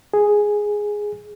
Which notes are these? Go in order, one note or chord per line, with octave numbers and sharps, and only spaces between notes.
G#4